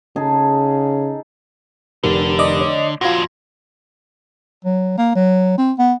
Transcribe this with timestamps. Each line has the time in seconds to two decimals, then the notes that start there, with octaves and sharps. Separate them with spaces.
0.16 C#3 D#4 G#4 A4
2.04 F1 D3 G4 A#4
2.39 D5 D#5 D6
2.60 C#5
3.01 F2 A#2 F4 F#4 C6 G#6 A#6
4.65 F#3
4.98 A#3
5.15 F#3
5.58 C4
5.79 B3